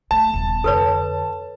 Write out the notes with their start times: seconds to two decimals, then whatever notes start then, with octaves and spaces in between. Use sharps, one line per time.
0.11 A3 A5
0.33 D#1 B3
0.64 F2 D3 A4 B4 C#5